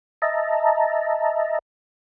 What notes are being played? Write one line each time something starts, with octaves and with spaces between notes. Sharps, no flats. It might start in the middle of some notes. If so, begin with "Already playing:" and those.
D#5 E5 A5 A#5